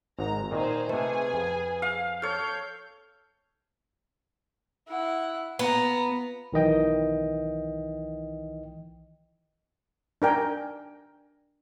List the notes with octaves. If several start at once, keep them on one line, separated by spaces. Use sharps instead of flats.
G#1 G#2 A#5
A#2 D#3 D#4 G#4 C5
C3 A3 G#4 B4 G#5
F2
F5
A4 C#5 F6 G6
E4 F#5
B3 F4 A#5
B1 D#3 E3 D#5 G5
D4 A#4 G5 G#5